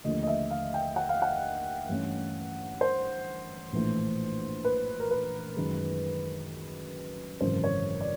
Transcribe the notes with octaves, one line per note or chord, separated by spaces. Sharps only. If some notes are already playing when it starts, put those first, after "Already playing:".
D#2 D3 F3 A3 D#5
D#5
E5
F5
G5
F#5
F5
F#5
G2 E3 A3 C#4
C5
A#1 A2 E3 A3
B4
A#4
B4
F#2 D#3 G#3
G#1 F#2 C#3 E3 C5
C#5
D5